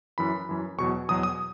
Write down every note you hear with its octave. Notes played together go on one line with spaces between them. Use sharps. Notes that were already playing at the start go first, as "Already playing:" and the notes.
F#2 E3 B5
F#2 E3
E2 B2 F#3 C#6
E2 B2 F#3 D#6
D#6